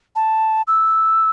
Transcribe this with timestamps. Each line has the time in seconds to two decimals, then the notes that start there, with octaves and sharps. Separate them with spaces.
0.16 A5
0.67 E6